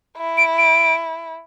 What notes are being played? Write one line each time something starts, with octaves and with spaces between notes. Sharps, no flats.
E4
D7
D7